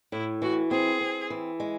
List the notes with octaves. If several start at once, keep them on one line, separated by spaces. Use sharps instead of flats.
A2 E4
E3 F#4
C4 G#4
C4
E3
G#3